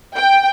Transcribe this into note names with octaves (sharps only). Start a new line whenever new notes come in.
G5